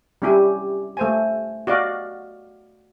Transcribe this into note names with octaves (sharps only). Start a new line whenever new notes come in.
G3 C#4 E4 G4 G#5
A3 C5 G#5
F#4 D5 D#5 F5